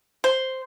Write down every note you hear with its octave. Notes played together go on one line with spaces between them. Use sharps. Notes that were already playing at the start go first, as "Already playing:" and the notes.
C5